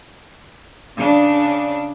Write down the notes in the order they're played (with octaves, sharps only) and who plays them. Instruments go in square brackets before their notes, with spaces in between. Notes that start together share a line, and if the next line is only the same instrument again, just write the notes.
[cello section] C#3 D4